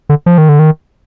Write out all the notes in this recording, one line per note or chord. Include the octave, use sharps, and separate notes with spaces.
D3
F3
D#3
D3
D#3